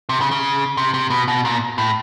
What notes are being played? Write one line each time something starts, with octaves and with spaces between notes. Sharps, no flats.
C3
C#3
C#3
C3
C3
B2
B2
A#2
A2